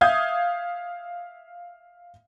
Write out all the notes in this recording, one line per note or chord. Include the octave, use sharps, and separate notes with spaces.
E5 F5 D#6 G6 G#6